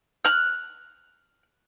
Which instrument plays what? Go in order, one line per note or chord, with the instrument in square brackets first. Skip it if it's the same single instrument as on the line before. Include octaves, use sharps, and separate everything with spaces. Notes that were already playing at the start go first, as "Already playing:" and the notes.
[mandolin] F6 F#6